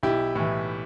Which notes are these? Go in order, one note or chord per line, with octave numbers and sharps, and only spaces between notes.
B1 E4 G4
A2 E3